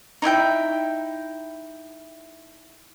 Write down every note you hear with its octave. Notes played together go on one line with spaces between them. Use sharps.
D#4 E4 E5 G5